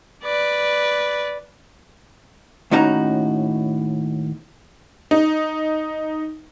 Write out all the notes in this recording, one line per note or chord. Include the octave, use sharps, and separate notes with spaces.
B4 D5
D#2 A2 C#4 D#4 F#4 A#5
D#4